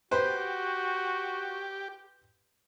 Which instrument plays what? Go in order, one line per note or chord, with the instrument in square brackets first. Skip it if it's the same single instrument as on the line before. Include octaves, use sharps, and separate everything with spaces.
[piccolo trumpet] F#4 [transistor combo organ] G4 [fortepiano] B4 C5